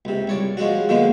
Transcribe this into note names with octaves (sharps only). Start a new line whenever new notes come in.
C#2 C3
C2 C#5 D5
F3 G#3 C#4 F#4
D3 F3 G#3 A#3 B3